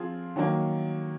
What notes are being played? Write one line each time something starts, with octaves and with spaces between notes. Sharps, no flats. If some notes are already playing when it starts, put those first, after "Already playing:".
Already playing: F3 C4 F4 G#4
D#3 F#3 A#3